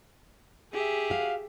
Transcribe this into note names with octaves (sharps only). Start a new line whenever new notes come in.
G4 G#4 E5
F#4 F5